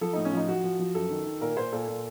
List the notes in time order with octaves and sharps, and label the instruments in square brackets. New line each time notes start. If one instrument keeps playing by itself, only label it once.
[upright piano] F3 A4
A2 D#4
C#4
F3 D#4
F3 F#4
F3
F3
F#2 A4
D#3
D#3
A#2 A#4
A#2 C5
A#2 A4
A#2